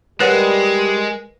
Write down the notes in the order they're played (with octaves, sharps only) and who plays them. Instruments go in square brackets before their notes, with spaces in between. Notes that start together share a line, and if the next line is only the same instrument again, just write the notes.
[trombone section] G3 [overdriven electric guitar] G#3 [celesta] A#4 E7 [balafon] B4 C#5 F#5